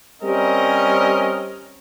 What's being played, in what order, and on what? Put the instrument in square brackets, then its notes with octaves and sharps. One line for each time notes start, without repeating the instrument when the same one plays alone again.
[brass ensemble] G3 C4 C#4 A#4 D#5